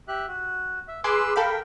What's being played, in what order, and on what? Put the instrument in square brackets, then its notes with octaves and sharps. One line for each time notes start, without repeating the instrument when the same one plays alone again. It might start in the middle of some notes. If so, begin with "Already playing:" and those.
[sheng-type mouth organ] G4 E5 F#6
F#4
E5
[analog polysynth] G#4 C6 D6 [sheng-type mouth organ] B4 E6 F#6
[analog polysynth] A4 F5 B5 [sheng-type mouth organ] A#4 G5